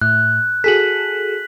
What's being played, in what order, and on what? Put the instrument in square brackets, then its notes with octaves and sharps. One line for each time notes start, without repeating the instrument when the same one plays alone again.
[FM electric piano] A2 [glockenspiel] F#6
[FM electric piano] F#4 G#4 A4 [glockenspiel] B6 F#7